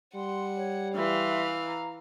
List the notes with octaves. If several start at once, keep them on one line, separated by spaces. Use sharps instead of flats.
G3 F#5 C6
C#5
E3 B4 E5 F5 C6
A#5